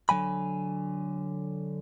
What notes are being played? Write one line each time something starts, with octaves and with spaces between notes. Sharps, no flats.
D3 F#3 G#5 B5